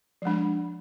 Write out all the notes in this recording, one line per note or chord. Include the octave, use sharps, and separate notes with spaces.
F3 G#3 D4